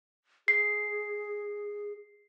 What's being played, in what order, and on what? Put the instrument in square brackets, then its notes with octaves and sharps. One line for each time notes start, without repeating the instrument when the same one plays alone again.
[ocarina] G#4 [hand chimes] C7